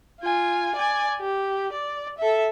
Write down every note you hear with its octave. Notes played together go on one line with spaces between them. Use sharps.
F4 G#5
D5 G#5
G4
D5
A4 E5